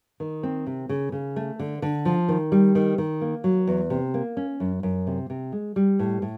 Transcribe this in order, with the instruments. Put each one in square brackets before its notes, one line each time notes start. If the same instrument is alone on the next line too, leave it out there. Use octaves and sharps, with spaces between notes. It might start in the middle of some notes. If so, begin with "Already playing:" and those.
[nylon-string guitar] D#3
C4
C3
C#3
C#3
A3
D3
D3
F3
D#3
G3
D#3
D#3
A#3
F#3
E2
C3
A#3
C#4
F#2
F#2
C3
C3
G#3
G3
A2
A2